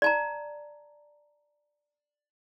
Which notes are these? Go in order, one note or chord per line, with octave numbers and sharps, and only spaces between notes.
D5 A5 A#5